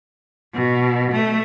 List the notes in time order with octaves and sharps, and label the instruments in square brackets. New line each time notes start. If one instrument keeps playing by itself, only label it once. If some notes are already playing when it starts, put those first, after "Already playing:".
[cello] B2
A3